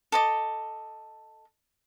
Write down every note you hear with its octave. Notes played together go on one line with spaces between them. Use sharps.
A4 D#5 D6